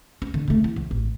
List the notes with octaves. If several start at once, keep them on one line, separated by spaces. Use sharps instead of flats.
C#4
D3
C#3 A3
E3
C#2
A1